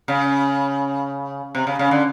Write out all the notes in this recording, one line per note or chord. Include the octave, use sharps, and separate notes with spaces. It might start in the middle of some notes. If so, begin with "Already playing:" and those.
C#3
C3
C#3
C#3
D3